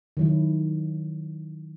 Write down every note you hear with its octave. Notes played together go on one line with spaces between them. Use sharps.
D#3 F#3 E4